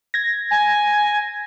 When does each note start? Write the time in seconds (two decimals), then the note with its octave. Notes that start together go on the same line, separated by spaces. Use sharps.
0.14 G#6 A#6
0.50 G#5